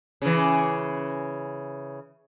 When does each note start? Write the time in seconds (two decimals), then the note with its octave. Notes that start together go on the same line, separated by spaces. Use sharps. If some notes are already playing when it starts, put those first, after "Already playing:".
0.22 C#3 E3